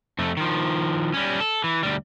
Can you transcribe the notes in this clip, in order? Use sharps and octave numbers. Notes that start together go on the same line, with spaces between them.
F2 A3
D#3 F3
G3 C#4
A4
E3
D2 G3